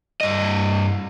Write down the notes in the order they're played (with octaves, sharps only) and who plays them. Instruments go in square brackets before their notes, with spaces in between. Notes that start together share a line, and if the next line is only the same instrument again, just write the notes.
[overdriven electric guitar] G2 D#5